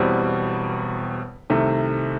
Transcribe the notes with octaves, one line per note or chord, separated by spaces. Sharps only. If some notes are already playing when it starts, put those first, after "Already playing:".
Already playing: E1 E2 B2 G3 C4
C2 C3 D#3 A3